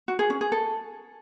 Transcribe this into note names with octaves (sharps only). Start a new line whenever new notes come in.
F#4
G#4
C#4
G#4
A4